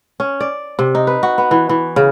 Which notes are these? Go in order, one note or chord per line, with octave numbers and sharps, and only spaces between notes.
C#4
D5
C3
D#4
B4
F#4
B3
E3
E3
C#3